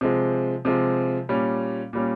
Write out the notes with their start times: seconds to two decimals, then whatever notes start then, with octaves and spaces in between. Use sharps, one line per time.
0.01 C3 F3 G#3
0.65 C3 F3 G#3
1.29 A#2 G3 C#4
1.93 A#2 G3 C#4